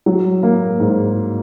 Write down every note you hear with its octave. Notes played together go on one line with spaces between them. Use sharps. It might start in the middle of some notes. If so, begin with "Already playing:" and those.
F#3
A#3
G#2